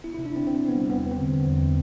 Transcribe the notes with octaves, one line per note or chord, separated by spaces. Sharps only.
B3 E4
E4
C3
D4
C3 C4
C3 C4
C3
B3
G3
E2 B3
B3
C4
D3
B3
E2